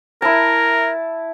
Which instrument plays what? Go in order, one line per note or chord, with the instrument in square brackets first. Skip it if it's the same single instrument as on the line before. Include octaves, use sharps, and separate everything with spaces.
[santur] E4 A5 [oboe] A#4